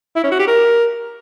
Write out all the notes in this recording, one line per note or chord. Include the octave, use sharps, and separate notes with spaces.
E4
C#4
F#4
G4
A#4